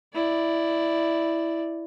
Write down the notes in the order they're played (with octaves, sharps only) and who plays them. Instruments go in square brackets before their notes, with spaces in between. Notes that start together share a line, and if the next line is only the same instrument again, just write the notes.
[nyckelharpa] E4 D5